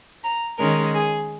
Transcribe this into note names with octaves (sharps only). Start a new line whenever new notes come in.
A#5
D#3 G#3 C#4 A#4
G#4